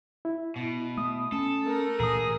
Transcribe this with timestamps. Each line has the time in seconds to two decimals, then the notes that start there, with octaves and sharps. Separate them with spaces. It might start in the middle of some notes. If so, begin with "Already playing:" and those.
0.25 E4
0.56 B2
0.98 A3 D#6
1.32 C#4 A4
1.64 A3 A#4
2.00 A#2 E3 G#4 A#5 D#6